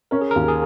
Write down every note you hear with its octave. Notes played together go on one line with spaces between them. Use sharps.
C#4 A#4
G#4
D#2 A#4
G#4